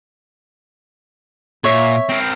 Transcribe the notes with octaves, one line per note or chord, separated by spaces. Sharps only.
A#2 C#5 E5
C4 A#4